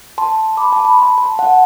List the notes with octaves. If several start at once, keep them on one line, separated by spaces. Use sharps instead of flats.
A5 C6
B5 D6
A5
B5
A5 C6
A5 C6
F#5 A5